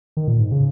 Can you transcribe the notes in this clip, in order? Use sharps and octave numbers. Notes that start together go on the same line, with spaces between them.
D#3
A#2
G#2
C#3